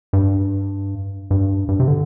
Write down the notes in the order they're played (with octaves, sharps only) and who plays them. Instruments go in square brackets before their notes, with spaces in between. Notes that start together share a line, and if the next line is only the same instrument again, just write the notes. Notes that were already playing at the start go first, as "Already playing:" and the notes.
[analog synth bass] G2
G2
G2
C3
D3